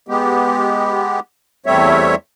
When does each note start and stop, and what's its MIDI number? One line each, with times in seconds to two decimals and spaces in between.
0.08 1.20 56
0.08 1.20 59
0.08 1.20 67
1.66 2.15 40
1.66 2.15 55
1.66 2.15 57
1.66 2.15 60
1.66 2.15 73
1.66 2.15 76